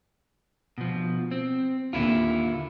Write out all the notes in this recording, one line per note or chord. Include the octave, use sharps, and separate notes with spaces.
B2 F3
C4
D#2 A#2 D3 E4 F4